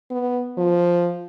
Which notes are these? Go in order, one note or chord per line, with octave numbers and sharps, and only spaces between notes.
B3
F3